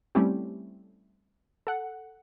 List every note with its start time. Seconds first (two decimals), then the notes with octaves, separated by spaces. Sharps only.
0.15 G3 A3 C4 C#4 E4 G4
1.67 A4 F#5